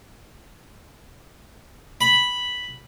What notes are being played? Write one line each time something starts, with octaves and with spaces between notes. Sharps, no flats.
B5